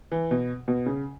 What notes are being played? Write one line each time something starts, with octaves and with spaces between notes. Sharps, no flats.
E3
B2
B2
C#3